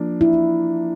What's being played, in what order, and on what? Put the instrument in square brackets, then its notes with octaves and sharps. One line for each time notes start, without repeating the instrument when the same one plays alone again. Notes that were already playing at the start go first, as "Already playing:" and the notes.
Already playing: [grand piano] F3 A#3 D4
[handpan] E4